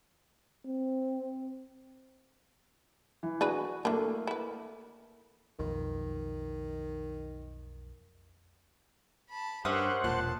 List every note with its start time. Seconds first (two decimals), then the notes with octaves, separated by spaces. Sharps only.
0.66 C4
3.23 E3
3.41 D4 F#4 G#4 B4
3.85 E3 A3 A#3 D4
4.27 E4 B4
5.60 B1 F2 D#3
9.30 A5 B5
9.65 G2 C#4 G4 A#4 C5 E5 F#5 D#6
10.04 E1 A#2 A5 F#6